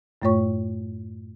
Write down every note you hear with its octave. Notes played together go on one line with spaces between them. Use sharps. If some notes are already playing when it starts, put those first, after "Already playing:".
F#2 A2 A3 F4 C#5 C#6